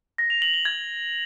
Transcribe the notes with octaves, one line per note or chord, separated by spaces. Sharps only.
A#6
F7
F#7
G7
G#6